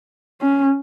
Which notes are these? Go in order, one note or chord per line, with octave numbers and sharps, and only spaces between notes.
C#4